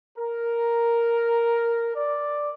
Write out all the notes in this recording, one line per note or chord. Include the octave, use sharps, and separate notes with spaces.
A#4
D5